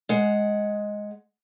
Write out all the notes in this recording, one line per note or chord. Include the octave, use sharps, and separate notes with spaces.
G#3 F#5